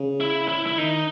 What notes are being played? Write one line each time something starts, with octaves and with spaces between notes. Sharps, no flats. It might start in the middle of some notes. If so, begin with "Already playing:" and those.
Already playing: C#3
E4
E4
E4
D#3 D#4